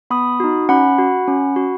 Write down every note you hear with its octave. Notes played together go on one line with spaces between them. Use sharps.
B3 B5 D#6
D#4 F#4
C#4 F#5 B5
F#4
C#4
F#4